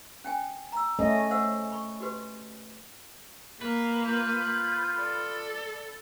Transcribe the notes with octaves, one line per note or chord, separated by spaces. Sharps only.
C#4 G5 G#5
A#5 E6
A3 C#4 D#5
C5 F#5 E6
B5 C#6
F#4 G4 B4
A#3 B4
F4 G6
A4 D5